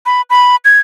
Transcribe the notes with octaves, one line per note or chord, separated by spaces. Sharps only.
B5
B5
G#6